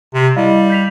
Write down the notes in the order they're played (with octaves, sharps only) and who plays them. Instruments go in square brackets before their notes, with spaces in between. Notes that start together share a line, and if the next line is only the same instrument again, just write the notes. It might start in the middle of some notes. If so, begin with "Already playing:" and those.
[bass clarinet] C3
[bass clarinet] G3 [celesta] E4 D#5 F5
[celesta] G6 B6 F7